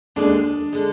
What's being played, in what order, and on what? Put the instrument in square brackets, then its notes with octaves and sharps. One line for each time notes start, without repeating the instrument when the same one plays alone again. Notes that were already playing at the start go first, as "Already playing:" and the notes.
[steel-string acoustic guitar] D#2 D3 G#3 [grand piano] D4
[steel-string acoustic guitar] D3 G#3